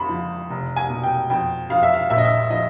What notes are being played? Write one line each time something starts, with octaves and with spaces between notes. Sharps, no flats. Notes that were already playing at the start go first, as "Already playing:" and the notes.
Already playing: F2 B5 C6
F3
F1
G#5
B2
G5
F2 G5
F2 F5
E5
F5
A#1 E5
D#5
E5
F3 D#5